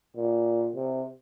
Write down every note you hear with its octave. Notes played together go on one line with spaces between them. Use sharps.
A#2
C3